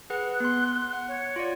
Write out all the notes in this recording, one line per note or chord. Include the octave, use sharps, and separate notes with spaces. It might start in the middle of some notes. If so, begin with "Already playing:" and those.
G#4 B4 F#5 F#6
B3 C6
F#5
C#5
F4 D5